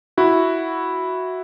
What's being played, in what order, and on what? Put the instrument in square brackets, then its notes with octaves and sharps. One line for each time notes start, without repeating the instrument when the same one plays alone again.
[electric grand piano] E4 F#4